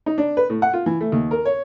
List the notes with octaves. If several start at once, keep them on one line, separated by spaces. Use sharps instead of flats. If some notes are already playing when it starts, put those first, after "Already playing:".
D#4
D4
B4
A2
F#5
F4
E3
A3
D#2
A#4
C#5